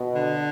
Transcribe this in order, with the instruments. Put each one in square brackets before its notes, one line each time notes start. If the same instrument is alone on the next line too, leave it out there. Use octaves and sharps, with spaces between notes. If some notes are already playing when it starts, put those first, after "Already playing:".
Already playing: [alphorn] B2
[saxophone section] D3